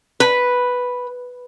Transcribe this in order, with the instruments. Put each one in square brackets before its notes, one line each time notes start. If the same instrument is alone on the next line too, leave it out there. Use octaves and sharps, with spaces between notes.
[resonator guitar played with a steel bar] B4